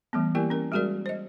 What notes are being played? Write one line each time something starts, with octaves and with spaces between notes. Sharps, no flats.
E3 G3 A3 B3
A#3 E4 G4 A#4 D5 G#5
C#4 A#4
G3 G#3 F#4 G#4 A#4 D5
C5 D#5